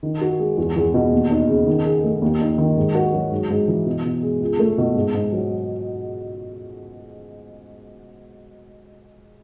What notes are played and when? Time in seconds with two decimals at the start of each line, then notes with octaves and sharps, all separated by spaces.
0.03 D#3
0.21 F#4
0.39 G#3
0.58 E2
0.76 E2
0.94 B2
1.13 D#2
1.30 D#4
1.49 C#3
1.67 D#3
1.85 G#4
2.04 A3
2.22 D#2
2.40 D#4
2.58 D#3
2.77 G#2
2.95 F#4
3.14 F#3
3.31 G#2
3.50 G#2
3.68 E3
3.86 B2
4.05 B2
4.23 G#3
4.41 C#2
4.59 A3
4.78 B2
4.96 G#2
5.14 G#2
5.32 F#3